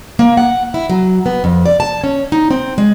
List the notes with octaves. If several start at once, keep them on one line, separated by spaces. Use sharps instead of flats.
A#3
F#5
E4
F#3
B3
F2
D5
A5
C#4
D#4
C4
G#3